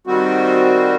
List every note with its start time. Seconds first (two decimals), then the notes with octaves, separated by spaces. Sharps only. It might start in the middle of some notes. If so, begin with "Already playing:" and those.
0.07 D#3 G3 C4 F#4